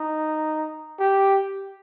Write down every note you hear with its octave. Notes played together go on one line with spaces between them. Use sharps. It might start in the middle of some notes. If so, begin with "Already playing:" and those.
Already playing: D#4
G4